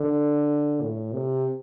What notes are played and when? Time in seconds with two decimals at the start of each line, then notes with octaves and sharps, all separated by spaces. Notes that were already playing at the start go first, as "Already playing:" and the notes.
Already playing: D3
0.82 A2
1.13 C3